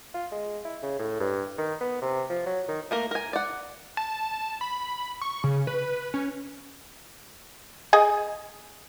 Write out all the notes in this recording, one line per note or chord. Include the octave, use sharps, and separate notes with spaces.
F4
G#3
E4
C#3
A2
G2
D#3
B3
C3
F3
F#3
D#3
A3 A#3 A#4
A#4 G#5
D5 F#5
A5
B5
C#6
C#3
B4
C#4
G#4 D#5 G#5